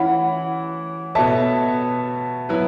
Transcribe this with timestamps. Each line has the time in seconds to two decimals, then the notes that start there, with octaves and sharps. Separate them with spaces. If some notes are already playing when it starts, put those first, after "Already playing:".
Already playing: E3 C#4 E4 F#5 B5
1.15 B2 B3 A4 C#5 E5 A5
2.49 F#3 B3 E4 B4